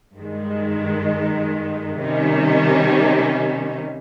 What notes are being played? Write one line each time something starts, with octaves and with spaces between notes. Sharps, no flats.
G2 D#3 G#3
C3 D#3 G3 C#4